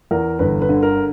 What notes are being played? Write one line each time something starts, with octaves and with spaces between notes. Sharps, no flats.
E2 A#4
G1 B4
B4
D3
A#4